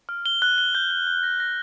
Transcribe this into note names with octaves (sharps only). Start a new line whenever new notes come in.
F6
G7
F#6
G7
G6
G6
G6
A#6
A#6